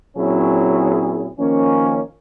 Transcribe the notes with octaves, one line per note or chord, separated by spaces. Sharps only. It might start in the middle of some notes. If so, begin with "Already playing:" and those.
A#2 F#3 C4 C#4 E4 G#4
D#3 F3 A#3 C#4